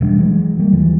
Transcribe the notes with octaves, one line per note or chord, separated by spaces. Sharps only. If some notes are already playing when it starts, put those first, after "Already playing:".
E1 E3 G3 D4
E3 F#3 G#3
G3 A3 A#3
D#2 E3 F3 G3